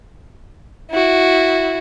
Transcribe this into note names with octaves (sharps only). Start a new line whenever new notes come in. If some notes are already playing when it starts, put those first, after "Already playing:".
E4 F#4